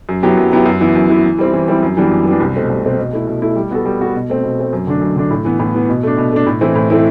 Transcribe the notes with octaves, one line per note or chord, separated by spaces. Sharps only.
F#2
F#3 B3 E4 G4
F#2
F#3 B3 E4 G4
F#2
E3 B3 E4
F#2
E3 B3 E4
E3
G3 C4 E4
E3
G3 C4 E4
F#2
E3 G3 B3 D4
F#2
E3 G3 B3 D4
C2
B2 A3 C4
C2
B2 A3 C4
B2
A3 E4
B2
A3 E4
G3
B3 F#4 A4
G3
B3 F#4 A4
B2
A3 C4
B2
A3 C4
F#2
D3 A3 D4
F#2
D3 A3 D4
A2
E3 B3
A2
E3 B3
B2
A3 D4
B2
A3 D4
A2
E3 A3 C4 E4
A2
E3 A3 C4 E4